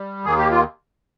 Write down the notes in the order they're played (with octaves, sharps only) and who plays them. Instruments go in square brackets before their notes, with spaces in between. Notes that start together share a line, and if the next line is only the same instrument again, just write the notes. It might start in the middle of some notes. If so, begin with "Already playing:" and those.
Already playing: [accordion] G3
D#2 D#3 A#3 G#4
G4
F4